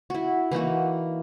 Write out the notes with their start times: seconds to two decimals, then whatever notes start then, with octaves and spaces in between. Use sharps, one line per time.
0.10 E4 F#4
0.52 E3 A#3 D#4 F#4